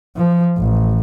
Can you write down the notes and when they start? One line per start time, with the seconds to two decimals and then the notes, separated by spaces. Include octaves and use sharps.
0.17 F3
0.58 A1